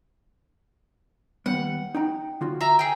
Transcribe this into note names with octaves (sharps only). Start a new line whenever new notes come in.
D#2 G3 B3 F#5
D#4 G5 A#5
D3 F4 F#4
E5 A#5
G#4 G5